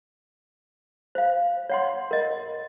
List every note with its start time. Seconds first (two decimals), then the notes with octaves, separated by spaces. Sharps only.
1.15 C5 F5
1.69 C#5 F#5 C6
2.11 A#4 D#5